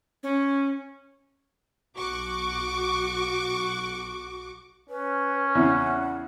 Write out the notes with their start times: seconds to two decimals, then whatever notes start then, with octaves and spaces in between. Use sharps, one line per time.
0.23 C#4
1.95 B1 F#4 C#6 D6
4.89 C#4 B4
5.55 E2 C#3 F#5